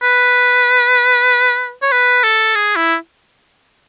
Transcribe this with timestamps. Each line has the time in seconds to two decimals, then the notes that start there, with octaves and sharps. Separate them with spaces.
0.03 B4
1.82 C#5
1.92 B4
2.23 A4
2.55 G#4
2.76 E4